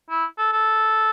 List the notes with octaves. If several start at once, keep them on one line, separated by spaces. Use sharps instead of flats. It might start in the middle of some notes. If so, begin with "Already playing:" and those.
E4
A4
A4